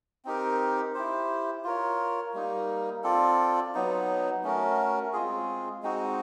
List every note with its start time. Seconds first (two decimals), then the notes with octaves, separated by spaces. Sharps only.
0.25 C4 D#4 G4 A#4
0.95 E4 G4 C5
1.64 F4 A#4 C#5
2.34 G3 A#3 D#4
3.04 C4 F4 A4 D5
3.74 F#3 B3 D#4
4.44 A3 C#4 F#4 A#4
5.13 G#3 C4 F4 G#4
5.82 G#3 C4 D#4 F#4